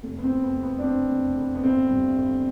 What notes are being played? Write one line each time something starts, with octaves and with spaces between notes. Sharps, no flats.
F1
B3
C4
E2
B3
F1
B3
D4
B2 C4
F1
E2
B3
G1 C4
G2
G1